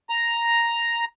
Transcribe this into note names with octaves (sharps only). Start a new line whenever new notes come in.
A#5